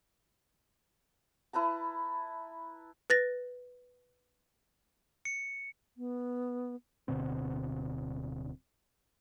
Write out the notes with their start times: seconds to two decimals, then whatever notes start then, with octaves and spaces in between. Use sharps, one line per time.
1.53 E4 B4 A5 A#5
3.10 B4 A6 A#6
5.25 C#7
5.97 B3
7.08 D1 B2 D3 C4